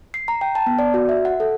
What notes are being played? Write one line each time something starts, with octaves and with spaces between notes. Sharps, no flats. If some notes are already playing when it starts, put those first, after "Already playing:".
C7
A#5
G5
A5
B3
D5
F#4
E5
F#5
A4